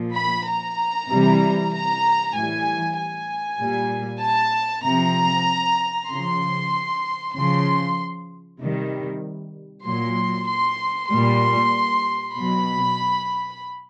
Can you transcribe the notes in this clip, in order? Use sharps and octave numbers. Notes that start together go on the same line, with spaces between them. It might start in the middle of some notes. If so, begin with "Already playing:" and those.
Already playing: A#2 F3
B5
A#5
C3 E3 G3
A#5
A2 E3 G3 G#5
G#5
A#2 G3
A5
C3 F3 A#5
C#3 F3 C6
C#3 F3 C6
C3 D#3 G3
A#2 F#3 C6
C6
A#2 G3 C6
B2 F#3 B5